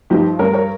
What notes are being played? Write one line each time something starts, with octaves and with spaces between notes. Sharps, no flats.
G2 F3 D#4 G4
G2 G3 A#4 C#5
A#4 C#5